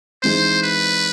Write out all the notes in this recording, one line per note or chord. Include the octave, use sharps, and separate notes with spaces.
G#2 E3 G#3 C4 C5
B4